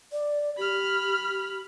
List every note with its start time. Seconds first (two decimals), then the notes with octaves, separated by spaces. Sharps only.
0.12 D5
0.58 G4 B5 F6